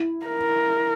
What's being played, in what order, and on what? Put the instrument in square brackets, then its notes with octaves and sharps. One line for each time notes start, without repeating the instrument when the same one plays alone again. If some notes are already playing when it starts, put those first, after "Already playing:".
Already playing: [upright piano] E4
[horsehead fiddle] A#4